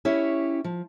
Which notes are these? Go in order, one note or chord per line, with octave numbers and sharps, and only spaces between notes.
C#4 E4 G4 C#5
F3